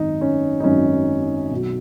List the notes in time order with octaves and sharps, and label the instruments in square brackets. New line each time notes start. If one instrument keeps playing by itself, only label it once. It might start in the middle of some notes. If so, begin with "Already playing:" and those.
Already playing: [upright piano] G#1 F#2 D#3 D#4
C#4
D#4
G#1 F#2 D#3 C#4
B1 B2 F#3